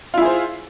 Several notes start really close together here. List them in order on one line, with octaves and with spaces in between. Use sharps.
F4 E4 G#4 C5